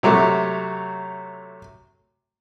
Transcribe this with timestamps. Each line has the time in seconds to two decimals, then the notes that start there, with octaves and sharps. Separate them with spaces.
0.03 C3 F#3 A3